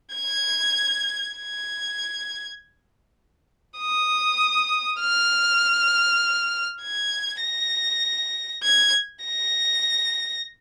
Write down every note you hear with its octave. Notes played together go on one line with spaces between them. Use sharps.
G#6
G#6
D#6
F6
G#6
A#6
G#6
A#6